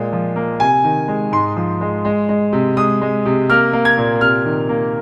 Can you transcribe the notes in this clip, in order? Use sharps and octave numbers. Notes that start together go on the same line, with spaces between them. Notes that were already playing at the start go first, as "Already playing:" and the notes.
Already playing: A#2 G#3
F3
A#3
C3 G#5
D#3
G#3
G#2 C6
F3
G#3
G#3
G#3
C3
G#3 D#6
G#3
C3
A#3 F6
A#3
G#6
A#2
C3 F6
D#3
A#3